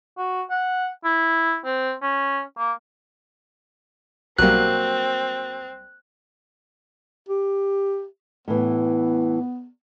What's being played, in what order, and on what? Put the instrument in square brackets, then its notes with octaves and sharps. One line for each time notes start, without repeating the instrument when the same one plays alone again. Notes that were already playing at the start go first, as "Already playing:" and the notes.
[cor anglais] F#4
F#5
E4
C4
C#4
A#3
[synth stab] B1 G3 [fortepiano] F#3 A#3 [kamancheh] C4 [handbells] F#6
[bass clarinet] G4
[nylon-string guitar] A2 E3 [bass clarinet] B3